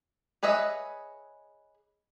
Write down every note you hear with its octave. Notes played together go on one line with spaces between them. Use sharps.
G#4 B4 C#5 D#5 E5